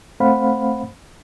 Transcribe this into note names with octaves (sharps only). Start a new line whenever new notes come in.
A3 C4 C5 F5 F#5 B5